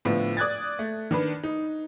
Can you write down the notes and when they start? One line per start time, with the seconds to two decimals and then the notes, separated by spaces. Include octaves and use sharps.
0.05 A2 D3 F3 B3
0.37 D5 D#6 F#6 G#6 A6
0.79 A3
1.11 D#3 D4 B4
1.44 D#4